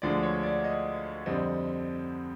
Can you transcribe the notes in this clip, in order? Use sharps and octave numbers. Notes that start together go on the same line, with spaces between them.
D2 D3 F3 G#3 D5
C#5
D5
D#5
F2 D3 G3 C4 D#5